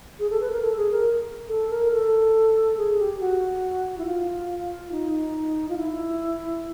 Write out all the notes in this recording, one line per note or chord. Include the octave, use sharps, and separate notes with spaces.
G#4
A4
B4
A#4
A4
G#4
A#4
A4
A#4
A4
G#4
G4
F#4
E4
F4
D#4
F4
E4